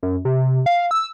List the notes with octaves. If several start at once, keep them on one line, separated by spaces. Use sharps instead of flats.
F#2
C3
F5
E6